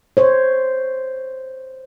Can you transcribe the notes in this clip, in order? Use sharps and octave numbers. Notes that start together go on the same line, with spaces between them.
C5 C#5